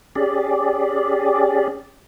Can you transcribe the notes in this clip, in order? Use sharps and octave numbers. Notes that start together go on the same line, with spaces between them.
C#4 G4 G#4 D5